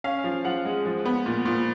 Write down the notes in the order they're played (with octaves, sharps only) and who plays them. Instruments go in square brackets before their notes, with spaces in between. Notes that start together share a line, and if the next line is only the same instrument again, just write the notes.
[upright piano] C#4 F5
F3
F3 F#5
G#3
F3
B3
A#2
A#2